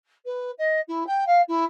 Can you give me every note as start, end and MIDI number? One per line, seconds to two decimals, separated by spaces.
0.25 0.51 71
0.57 0.80 75
0.88 1.05 64
1.06 1.24 79
1.26 1.41 77
1.48 1.64 64